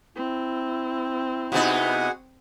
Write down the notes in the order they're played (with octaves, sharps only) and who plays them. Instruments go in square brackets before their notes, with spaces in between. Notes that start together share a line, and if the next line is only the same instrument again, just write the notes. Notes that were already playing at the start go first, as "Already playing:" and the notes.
[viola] C4 [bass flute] E4
[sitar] C3 B3 D#4 [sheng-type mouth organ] F#4 G#4 F#5